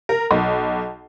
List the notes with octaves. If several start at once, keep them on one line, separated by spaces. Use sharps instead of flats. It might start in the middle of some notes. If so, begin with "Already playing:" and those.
A#4
B1